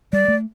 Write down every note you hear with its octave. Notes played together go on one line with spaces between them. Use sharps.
G3 D5
A3